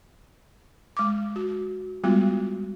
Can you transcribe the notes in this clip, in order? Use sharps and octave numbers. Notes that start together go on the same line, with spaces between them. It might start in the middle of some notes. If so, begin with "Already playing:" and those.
G#3 D6
F#4
G3 G#3 B3 F4 F#4